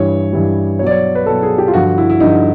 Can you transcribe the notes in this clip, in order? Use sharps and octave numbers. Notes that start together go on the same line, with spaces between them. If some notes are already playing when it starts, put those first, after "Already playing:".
Already playing: G2 E3 G3 C#5
G2 E3 G3
B2 F#3 C#5
D5
C#5
B4
B2 F#3 A4
G#4
G4
F4
G2 D3 F3 F#4
E4
E4
G2 D3 F3 D#4